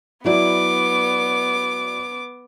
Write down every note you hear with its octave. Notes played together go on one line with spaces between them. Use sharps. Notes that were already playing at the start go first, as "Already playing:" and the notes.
F#3 B3 E4 D5 D6